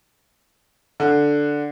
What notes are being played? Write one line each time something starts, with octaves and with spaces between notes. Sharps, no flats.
D3